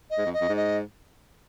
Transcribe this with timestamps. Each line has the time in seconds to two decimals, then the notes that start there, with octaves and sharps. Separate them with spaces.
0.10 D#5
0.18 G#2
0.25 F2
0.33 D#5
0.41 F2
0.49 G#2
0.57 D#5